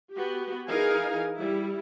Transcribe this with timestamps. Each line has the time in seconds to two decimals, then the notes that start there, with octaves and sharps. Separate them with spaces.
0.13 B3 F#4 G4
0.68 E3 D#4 G#4 A#4 F5 G#5
1.36 G3 E4